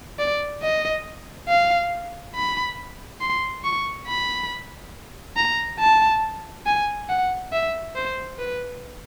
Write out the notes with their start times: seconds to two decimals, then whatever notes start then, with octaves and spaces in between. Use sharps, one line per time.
0.19 D5
0.62 D#5
1.48 F5
2.35 B5
3.21 C6
3.64 C#6
4.08 B5
5.37 A#5
5.80 A5
6.66 G#5
7.09 F#5
7.53 E5
7.96 C5
8.39 B4